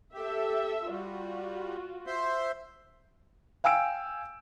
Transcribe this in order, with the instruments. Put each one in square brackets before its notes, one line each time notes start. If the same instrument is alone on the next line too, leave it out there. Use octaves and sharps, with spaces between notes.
[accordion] G4 [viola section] A4 E5
[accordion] G3 [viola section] F4 F#4
[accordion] C5 E5 C6
[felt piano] F5 G5 G#5 E6 D7